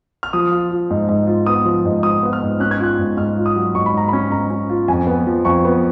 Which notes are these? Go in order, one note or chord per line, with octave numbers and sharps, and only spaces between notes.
F6
F3 D#6
F4
F4
G#2
G#2
F4
B3 D#6
F3
G#2
F4 D#6
B3
F6
G#2
C#4 F#6
G#6
F4 F#6
G#2
G#2 F6
F4
D#6
F#3
G#2 C#6
B5
G#2 A#5
C#4 B5
G#2 A#5
C#4
F4
F2 G#5
B3
F3
F2 C#6
B3